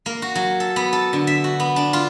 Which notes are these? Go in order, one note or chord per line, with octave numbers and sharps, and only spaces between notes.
A#3
F#4
F#3
A4
B3
A4
D3
E5
F#4
B3
D4
F4